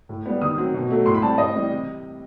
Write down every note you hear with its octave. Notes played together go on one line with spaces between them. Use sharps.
A2
G3 B3
D#3 D#6
F#3 C4
B2
F#3 A3
A2 C6
B5
G3 C4 A5
A2 D#5
E3 G3 C4
C3